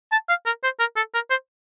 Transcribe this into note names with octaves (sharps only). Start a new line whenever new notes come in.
A5
F5
A#4
C5
A#4
A4
A#4
C5